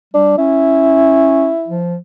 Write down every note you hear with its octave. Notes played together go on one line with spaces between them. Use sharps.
G3 D4
C#4 E4
F3